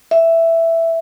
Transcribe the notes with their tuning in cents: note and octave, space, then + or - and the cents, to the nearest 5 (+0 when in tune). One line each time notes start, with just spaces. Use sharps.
E5 +5